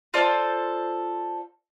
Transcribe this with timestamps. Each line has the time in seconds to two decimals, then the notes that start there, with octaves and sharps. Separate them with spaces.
0.14 F4 A4 C5 D5